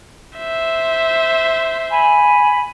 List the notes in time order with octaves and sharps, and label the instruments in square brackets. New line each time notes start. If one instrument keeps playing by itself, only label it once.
[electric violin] C5 E5
[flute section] G#5 B5